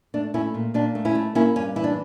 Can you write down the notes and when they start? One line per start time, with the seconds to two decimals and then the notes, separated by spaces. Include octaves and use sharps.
0.14 A3 D4
0.34 A3 C#4 E4
0.54 A#2
0.74 A#2 D4
0.95 A3
1.05 C#4 E4
1.15 A3
1.35 A#3 C#4 E4
1.56 G2 C#4
1.76 E3 E4
1.84 D4